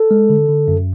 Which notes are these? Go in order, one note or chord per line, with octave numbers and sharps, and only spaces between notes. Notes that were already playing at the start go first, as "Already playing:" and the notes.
Already playing: A4
G#3
D3
D3
F#2